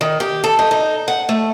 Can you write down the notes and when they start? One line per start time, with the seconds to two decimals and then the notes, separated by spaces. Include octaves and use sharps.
0.01 D#3
0.20 G4
0.44 A4
0.59 D#4
0.71 D#4
1.08 F#5
1.29 A3